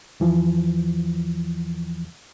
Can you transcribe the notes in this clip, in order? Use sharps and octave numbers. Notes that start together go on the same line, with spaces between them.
E2 E3 F3